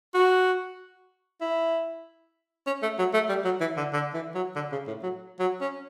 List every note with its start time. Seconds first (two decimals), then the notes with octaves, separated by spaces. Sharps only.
0.14 F#4
1.41 E4
2.67 C#4
2.82 A3
2.99 F#3
3.14 A3
3.29 G3
3.45 F#3
3.61 E3
3.77 D3
3.93 D3
4.14 E3
4.35 F#3
4.56 D3
4.72 C#3
4.87 A2
5.03 F#3
5.40 F#3
5.61 C#4